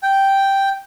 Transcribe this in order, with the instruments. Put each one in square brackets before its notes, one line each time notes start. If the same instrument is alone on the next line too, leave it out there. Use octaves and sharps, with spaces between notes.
[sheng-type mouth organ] G5